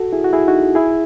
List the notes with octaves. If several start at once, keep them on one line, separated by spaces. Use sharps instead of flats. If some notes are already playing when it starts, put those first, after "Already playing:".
Already playing: F#4 A4
E4 G#4
F#4
E4 G#4
D#4 F#4
E4 G#4